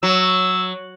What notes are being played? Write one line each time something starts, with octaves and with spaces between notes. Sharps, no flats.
F#3 E6